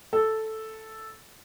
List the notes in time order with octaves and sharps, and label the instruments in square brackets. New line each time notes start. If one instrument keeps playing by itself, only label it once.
[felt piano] A4